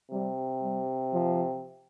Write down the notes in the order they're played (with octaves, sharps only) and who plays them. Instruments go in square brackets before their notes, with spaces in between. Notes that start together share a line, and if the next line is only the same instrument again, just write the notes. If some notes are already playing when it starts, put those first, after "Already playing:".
[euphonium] C3 [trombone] G3
[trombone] G3
F3